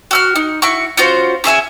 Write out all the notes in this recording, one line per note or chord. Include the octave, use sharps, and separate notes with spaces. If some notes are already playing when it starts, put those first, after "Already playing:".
F#4 E6 F6
D#4
E4 F#4 C#6
C#4 F4 F#4 C5
C#4 G#4 E5 G#5